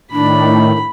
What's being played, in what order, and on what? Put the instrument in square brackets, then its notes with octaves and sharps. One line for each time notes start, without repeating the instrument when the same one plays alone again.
[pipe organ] A2 D#3 [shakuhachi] D4 [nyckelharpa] B5